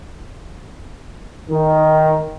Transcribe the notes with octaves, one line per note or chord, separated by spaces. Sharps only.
D#3